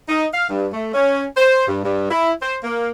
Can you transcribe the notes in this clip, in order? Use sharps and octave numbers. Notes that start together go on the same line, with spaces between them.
D#4
F5
G2
A3
C#4
C5
G2
G2
E4
C5
A#3